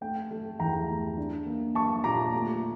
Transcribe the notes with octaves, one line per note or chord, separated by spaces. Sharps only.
A3 G5
A3
E2 G5 A#5
A3
D4
A#3
A#3 A5 C#6
A#2 A#5 D6
A3